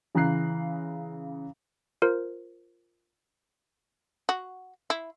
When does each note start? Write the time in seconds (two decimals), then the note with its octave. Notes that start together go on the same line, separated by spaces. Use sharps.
0.15 C#3 E3 F5 A#5 F#6 C7
2.02 F4 A#4 C5
4.29 F#4
4.90 E4